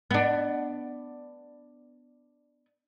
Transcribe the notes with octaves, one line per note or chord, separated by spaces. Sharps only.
B3 D4